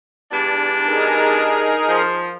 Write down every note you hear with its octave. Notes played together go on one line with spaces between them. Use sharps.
E2 G2 D4
D#4 G#4 A#4
F3